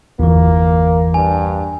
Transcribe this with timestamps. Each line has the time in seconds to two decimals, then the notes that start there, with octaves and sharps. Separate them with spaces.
0.19 G1 E2 E3 A#3
1.14 G2 G#5